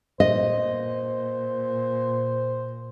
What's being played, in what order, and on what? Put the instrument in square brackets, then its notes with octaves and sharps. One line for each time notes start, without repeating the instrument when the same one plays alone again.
[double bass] A#2 [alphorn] C5 [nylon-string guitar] D#5